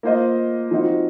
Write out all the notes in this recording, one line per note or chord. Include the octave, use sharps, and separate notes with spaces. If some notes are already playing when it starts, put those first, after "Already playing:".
A#3 F4 C5 D#5
F3 C4 D#4 F#4